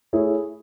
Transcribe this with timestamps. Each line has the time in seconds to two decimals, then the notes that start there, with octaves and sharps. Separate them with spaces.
0.13 A3 E4 G#4 C#5